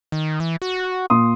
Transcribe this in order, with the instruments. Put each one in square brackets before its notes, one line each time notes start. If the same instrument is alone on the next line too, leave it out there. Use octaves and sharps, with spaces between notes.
[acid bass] D#3
E3
F#4
[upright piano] A#2 C6 D#6